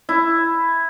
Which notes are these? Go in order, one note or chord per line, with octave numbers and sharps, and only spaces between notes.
E4